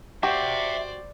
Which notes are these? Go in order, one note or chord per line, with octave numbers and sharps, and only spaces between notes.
F#4 G4 C5 D5 E5 G5